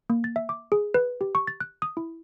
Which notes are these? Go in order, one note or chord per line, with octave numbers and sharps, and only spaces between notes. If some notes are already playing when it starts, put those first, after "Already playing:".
A#3
A6
E5
D6
G#4
B4
G4
C#6
A6
F#6
D#6
E4